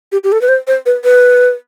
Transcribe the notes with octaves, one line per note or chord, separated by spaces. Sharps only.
G4
G4
A4
B4
C5
C5
B4
B4